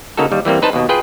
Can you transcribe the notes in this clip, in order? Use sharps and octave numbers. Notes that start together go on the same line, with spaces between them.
C#3 A#3 D#4 F#4 A4
D#2 G3
E3 G3 A#3 C4
D#4 B4 C5 A5
D#2 B2
F4 G#4 B4 G5